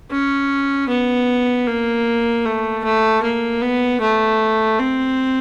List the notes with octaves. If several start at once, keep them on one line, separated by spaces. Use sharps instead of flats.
C#4
B3
A#3
A3
A3
A#3
B3
A3
C4